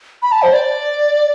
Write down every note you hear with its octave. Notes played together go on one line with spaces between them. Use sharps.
B5
A5
C5
D5